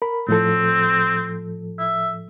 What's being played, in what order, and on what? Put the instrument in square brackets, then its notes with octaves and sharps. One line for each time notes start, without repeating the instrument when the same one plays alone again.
[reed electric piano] A#4 B5
[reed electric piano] A2 F3 A4 [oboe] C4
[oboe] E5